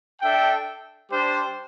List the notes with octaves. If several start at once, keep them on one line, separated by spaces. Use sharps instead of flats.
D4 A4 E5 G5
G3 D4 G4 C5